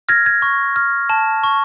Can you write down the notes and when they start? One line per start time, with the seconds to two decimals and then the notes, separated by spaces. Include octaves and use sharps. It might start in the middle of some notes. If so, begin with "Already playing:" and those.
0.09 F6 G#6 A#6
0.26 G#6
0.42 C#6
0.76 F6
1.10 A5
1.44 C#6